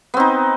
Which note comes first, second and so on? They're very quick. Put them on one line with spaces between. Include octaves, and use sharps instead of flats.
B3 C4 D#4